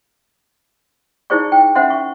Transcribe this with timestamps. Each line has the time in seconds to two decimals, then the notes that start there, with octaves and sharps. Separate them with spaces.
1.30 D#4 E4 G#4 C5 D5 C#6
1.52 G5
1.75 C#4 C5 E5 F#5 C6
1.90 C#6